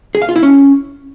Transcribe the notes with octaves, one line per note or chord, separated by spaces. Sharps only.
G#4
F5
F4
E4
C#4